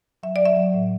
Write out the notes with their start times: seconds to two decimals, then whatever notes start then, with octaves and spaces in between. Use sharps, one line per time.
0.23 F#3 E5
0.36 F#3 D5
0.46 E5
0.56 F#3
0.74 A2